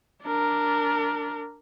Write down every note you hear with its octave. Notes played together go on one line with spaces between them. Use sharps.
D4 A#4